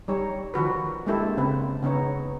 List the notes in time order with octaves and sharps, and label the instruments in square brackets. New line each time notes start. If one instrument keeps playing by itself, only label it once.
[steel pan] G3 D#4 C#5
D#3 F3 F#4 B4
G#3 A#3 D4 E4 G4 A4
C#3 A#3 C4 B4
C#3 B3 D#4 C#5